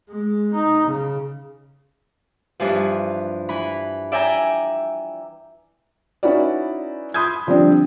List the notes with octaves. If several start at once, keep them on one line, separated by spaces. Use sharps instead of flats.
G#3
D#4
C#3
G2 E3 F3
E3 B5
D5 E5 G5 G#5 A#5 E6
C#4 D#4 E4 F#4 B4 D5
B5 C6 D#6 G6 G#6
D3 F3 G3 C4 D4